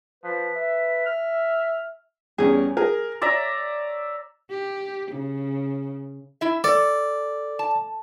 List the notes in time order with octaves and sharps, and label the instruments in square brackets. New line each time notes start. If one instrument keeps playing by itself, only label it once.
[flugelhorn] F3 [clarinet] B4
[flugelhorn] E5
[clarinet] F6
[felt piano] E2 G3 C#4 [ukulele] G#4
[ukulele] G#4 [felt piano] A#4
[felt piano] C#5 [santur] D5 E5 A#5
[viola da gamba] G4
C#3
[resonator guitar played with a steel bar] E4 E5
[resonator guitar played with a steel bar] A4 [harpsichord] D5
[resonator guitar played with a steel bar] A5